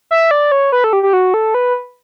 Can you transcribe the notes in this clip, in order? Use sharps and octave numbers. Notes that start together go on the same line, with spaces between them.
E5
D5
C#5
B4
A4
G4
G4
F#4
A4
B4